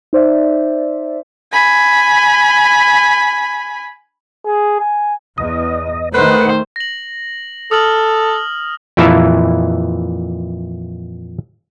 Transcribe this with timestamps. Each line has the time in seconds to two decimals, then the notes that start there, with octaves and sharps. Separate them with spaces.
0.13 D#4 C5 D5 E5
1.52 G#5 B5
4.45 G#4
4.80 G#5
5.38 E2 D#5
6.14 D#3 A3 B4 C5 F#5
6.76 A#6 F#7
7.71 A4 D#6 F6 F#7
8.97 F2 A#2 E3 E4 F5 A5